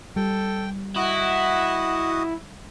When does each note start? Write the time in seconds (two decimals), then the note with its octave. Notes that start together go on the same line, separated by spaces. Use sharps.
0.16 G3 A4 G5
0.96 E4 F#4 D#5 F#5 D#6